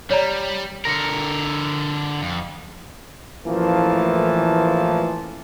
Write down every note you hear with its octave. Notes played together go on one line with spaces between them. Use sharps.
G3 C#5 D5 A#5
D3 A#4 A#6 C#7
F2
A1 E3 F3 A3 A#3 A5